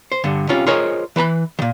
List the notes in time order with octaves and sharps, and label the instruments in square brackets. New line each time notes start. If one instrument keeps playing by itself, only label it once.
[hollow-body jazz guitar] C5
G2 D3
C3 C#4 F4
F4 G#4 A#4 C5 C#5 D#5
E3 B4 A5 B5
A#2 D#3